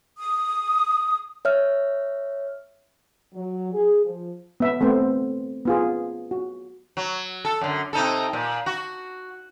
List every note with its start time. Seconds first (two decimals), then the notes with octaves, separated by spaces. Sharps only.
0.19 D#6
1.45 C#5 E5 F6
3.33 F#3
3.73 G#4
4.04 F3
4.60 B3 E5
4.81 A3 B3 C4 C5
5.65 B3 F4 G#4
6.31 F#4
6.97 F#3
7.45 A4
7.61 F#2 D3
7.93 C3 D#4 A4
8.33 A#2
8.66 F#4